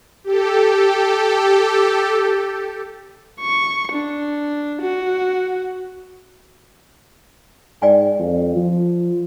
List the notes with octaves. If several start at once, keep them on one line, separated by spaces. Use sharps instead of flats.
G4 A4
C#6
D4
F#4
G#2 D5 G5 G#5
F2
F3